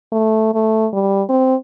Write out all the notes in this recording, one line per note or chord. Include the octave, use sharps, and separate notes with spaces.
A3
A3
G3
C4